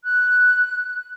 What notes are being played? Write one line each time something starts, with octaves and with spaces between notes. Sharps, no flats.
F#6